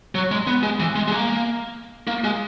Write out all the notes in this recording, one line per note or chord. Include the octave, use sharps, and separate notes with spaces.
F#3
G#3
B3
G#3
E3
G#3
G#3
A#3
A#3
G#3